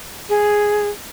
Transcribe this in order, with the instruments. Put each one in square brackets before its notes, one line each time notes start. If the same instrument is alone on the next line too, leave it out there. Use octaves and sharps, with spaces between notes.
[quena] G#4